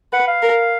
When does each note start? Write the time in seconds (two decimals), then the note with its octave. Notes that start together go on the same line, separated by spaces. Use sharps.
0.13 B4 F#5
0.27 F5
0.42 A#4